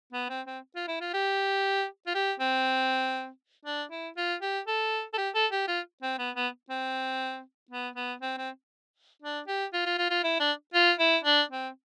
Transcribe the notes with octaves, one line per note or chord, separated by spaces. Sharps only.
B3
C4
C4
F4
E4
F4
G4
F4
G4
C4
D4
E4
F4
G4
A4
A4
G4
A4
G4
F4
C4
B3
B3
C4
B3
B3
C4
C4
D4
G4
F4
F4
F4
F4
E4
D4
F4
E4
D4
C4